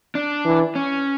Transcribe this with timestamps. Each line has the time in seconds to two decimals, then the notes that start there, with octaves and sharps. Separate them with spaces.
0.15 D4
0.45 E3
0.75 C#4